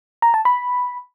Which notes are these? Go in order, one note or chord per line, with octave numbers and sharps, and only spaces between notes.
A#5
A5
B5